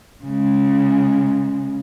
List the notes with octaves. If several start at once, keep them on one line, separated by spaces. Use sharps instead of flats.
C#3 G#3